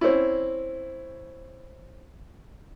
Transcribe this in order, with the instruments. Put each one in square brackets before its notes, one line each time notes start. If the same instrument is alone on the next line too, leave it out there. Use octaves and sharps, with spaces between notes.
[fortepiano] C4 C#4 E4